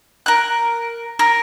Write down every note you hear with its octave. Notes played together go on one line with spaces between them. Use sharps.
A#4 F#6
A#4